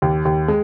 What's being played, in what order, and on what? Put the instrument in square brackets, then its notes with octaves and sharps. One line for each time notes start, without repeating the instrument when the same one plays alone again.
[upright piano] D#2
D#2
G#3